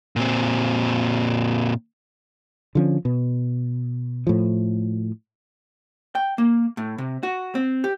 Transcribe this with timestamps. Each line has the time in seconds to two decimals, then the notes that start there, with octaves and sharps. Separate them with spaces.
0.16 A#2 C4
2.75 D3 F3 C#4
3.05 B2
4.27 A2 F3
6.15 G5
6.38 A#3
6.77 A2
6.98 C3
7.23 F#4
7.55 C4
7.84 G4